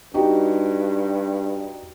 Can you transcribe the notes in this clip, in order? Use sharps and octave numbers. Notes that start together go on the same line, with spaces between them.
G2 D#4 F#4 G4